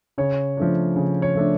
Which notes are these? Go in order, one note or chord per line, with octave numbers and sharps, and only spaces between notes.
C#3 C#5
F3 A3 D4
C#3
C#5
F3 A3 D4